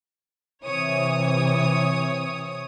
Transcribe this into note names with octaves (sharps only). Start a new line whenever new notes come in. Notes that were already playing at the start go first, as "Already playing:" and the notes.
C3 E3 C#5 D#6